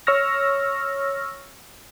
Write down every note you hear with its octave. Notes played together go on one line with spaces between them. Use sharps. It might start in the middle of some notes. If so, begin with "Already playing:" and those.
C#5 C#6 E6 F6 A#6